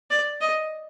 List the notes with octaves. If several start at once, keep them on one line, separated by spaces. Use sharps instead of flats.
D5
D#5